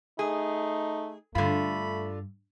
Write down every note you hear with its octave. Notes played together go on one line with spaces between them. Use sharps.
A3 D#4 G#4
G2 D3 A3 F4 B5